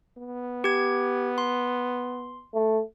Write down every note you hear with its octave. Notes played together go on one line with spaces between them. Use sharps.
B3
G4 G#6
C6
A3